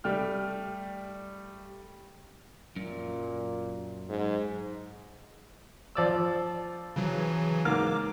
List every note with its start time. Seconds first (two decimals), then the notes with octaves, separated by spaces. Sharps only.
0.04 G3 A3 G5 F6
2.76 F#2 A#2
4.09 G#2
5.95 F3 D5 E6
6.96 C#3 E3 F#3
7.65 G#2 A#3 D6 F6